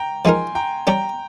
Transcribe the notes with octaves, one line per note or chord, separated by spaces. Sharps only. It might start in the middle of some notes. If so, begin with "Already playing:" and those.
Already playing: G5 A#5
F3 G#3 D#4 A#4 G#5 C6
G5 A#5
G3 C#4 G4 G5 A#5